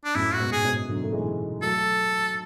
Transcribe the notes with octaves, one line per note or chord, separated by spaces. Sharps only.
D4
F#2 A2 E4
F#4
G#2 B2
G#4
G#2 B2
D3 F#3
A3
E3 G#3
F#3 A3 A4